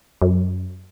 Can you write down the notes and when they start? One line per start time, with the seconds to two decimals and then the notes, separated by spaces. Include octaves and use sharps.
0.22 F#2